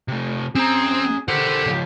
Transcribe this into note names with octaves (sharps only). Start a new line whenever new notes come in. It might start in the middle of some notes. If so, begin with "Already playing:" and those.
C3 A3
C4 C#4 G#4 A#5
G4 A4 A#4 C5 F#5
C#3 F3